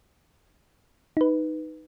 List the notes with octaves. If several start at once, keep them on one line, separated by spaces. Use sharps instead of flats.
D#4 B4